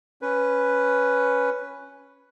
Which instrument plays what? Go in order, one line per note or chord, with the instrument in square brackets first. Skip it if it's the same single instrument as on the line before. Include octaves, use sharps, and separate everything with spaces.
[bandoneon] C#4 B4